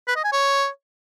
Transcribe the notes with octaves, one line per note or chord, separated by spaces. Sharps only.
B4
D#5
G#5
C#5